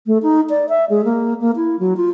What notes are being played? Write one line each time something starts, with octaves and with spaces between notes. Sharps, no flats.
A3
D#4
D5
E5
G#3
A#3
A#3
E4
F#3
F4